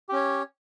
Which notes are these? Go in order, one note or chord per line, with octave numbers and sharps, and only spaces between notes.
C#4 G4 C#5